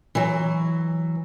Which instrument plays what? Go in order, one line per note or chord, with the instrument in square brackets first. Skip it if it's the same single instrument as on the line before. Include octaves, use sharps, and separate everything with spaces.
[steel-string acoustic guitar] E3 F#3